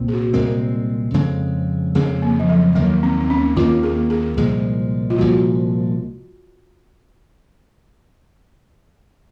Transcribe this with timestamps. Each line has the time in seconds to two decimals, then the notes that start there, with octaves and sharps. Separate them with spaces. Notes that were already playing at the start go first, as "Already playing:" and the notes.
Already playing: C2 A#2 C4
0.08 G#4
0.13 F#4
0.33 C2 A#2 G#3 C4 A#4
1.14 F2 C#3 G#3 C4
1.95 F2 C#3 G#3 C4 G#4
2.22 A#3
2.40 F3
2.49 F#3
2.75 D#2 D#3 F#3 A#3
3.03 C4
3.20 C4
3.30 C#4
3.56 D#2 D#3 A#3 F4
3.83 G#4
4.10 G#4
4.37 C2 A#2 F3 G#3 G#4
5.10 F4
5.18 C2 A#2 F3 G#3 F#4